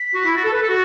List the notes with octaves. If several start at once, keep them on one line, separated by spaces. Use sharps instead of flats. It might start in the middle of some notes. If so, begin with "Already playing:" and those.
Already playing: B6
F#4
E4
F#4 A6
A4
B4
A4
F#4